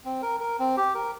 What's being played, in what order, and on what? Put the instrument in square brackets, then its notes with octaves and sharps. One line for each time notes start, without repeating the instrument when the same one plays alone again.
[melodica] C4
A#4
A#4
C4
G4
A#4